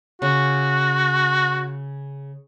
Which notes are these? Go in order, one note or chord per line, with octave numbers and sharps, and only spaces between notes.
C#3 F#4